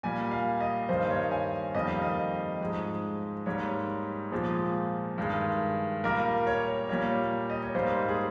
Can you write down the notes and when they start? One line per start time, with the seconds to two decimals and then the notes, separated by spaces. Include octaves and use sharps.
0.03 A#2 G3 A#3 G#5
0.31 F5
0.60 D#5
0.89 G2 D#3 G3 A#3 C5
1.10 C#5
1.31 G#5
1.74 F2 D#3 G3 A#3 D#5
1.88 F5
2.02 D#5
2.61 G#2 F3 G#3
3.46 G#2 G3 A#3 C#5
4.32 A#2 F3 G#3
5.18 G2 D#3 G#3
6.04 A#2 G3 A#3 A#4
6.47 C#5
6.89 A#2 G3 A#3 C#5
7.50 D#5
7.62 C#5
7.75 G#2 G3 A#3 C5
8.08 G#4